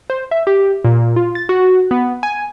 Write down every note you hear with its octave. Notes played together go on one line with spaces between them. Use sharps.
C5
E5
G4
A#2
F4
A6
F#4
B3
G#5